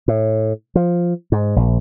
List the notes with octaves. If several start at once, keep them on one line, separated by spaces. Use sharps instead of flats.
A2
F3
G#2
A#1